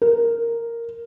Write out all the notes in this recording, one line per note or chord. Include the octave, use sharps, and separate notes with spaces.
A#4